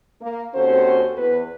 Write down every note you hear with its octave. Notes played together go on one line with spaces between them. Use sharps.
A#3
D#2 C4 C#4 F#4 A4 C5
E2 B3 B4